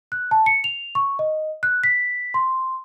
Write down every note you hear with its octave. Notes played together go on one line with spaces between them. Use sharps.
F#6
A5
C#7
F7
C#6
D#5
F#6
B6
C6